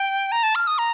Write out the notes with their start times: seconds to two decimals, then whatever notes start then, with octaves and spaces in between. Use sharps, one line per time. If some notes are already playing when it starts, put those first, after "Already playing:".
Already playing: G5
0.32 A#5
0.43 A5
0.55 F6
0.67 D#6
0.78 A#5